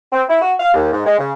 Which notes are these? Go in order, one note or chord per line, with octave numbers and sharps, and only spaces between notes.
C4
E4
F#4
F5
D#2
G#2
G#3
C#3